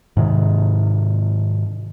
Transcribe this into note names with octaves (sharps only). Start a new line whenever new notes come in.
G#2 C3 D#3